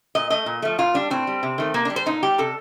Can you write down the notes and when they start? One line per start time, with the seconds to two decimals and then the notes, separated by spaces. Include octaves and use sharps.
0.15 A#2 D#5
0.30 A3 D#5
0.46 A#2
0.62 F3 A3
0.78 A#2 F4
0.94 G3 D4
1.10 A2 C4
1.27 G3
1.43 C3
1.58 D#3 A3
1.74 C3 A#3
1.85 G3 D4
1.96 C5
2.06 A#2 D#4
2.23 G3 G4
2.38 C3 A4